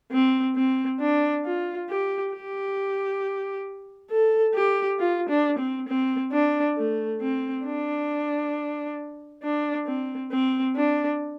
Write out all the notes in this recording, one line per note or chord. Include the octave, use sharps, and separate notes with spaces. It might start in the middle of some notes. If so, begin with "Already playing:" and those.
C4
C4
D4
F4
G4
G4
A4
G4
F4
D4
C4
C4
D4
A3
C4
D4
D4
C4
C4
D4